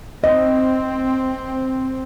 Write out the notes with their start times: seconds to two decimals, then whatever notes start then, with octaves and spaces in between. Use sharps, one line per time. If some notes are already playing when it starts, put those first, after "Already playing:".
0.24 C4 D#5